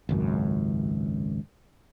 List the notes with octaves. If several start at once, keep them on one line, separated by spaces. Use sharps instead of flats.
G#1 C#2 F#2